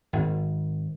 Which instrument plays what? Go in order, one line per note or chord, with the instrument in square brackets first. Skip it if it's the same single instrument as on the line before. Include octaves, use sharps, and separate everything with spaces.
[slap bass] G#1